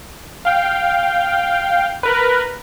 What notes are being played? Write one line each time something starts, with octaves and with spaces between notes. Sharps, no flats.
F5 G5
A#4 B4